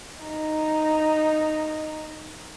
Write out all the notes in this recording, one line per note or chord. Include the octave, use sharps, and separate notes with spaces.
D#4 A#5